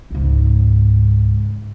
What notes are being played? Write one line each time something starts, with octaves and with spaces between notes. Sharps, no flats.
C#2 G#2